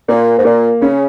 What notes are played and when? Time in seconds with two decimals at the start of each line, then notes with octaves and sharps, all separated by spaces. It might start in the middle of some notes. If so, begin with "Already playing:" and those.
0.09 A#2 A#3
0.38 G#2
0.45 A#2 A#3
0.81 C#3 C#4